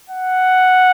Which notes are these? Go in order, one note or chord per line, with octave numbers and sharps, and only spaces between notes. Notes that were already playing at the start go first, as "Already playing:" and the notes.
F#5